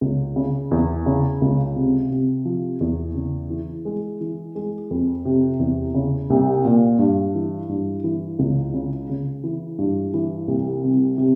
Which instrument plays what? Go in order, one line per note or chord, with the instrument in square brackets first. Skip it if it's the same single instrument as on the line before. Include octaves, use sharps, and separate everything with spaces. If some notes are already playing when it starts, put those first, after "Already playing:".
[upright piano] C#2
C#3
E2
C#3
C#2
C3
C3
F3
E2
C#3
E3
G#3
E3
G#3
F2
C3
E2
C#3
C2
A#2
G2
E3
G2
E3
C#2
C#3
C#3
E3
G2
E3
C2
C3
C3